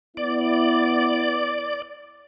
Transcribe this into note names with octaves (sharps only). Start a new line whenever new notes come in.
B3 E4 D5